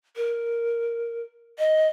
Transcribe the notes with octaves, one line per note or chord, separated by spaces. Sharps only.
A#4
D#5